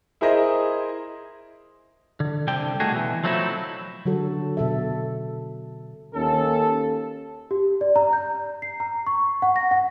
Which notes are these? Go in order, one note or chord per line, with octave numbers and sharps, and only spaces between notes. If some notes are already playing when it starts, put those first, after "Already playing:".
E4 G#4 A#4 C5 D#5 E5
D3
C2 D3 D4 G5
A3 D#4 F#4 G#4
B2 E3
F3 F#3 A3 C4 D#4 E4
D3 F#3 F#4 A4
B2 A4 E5
D#2 C#4 A4
G4
D5
A#5
G6
C7
A#5
C#6
F#5
A#6
F#5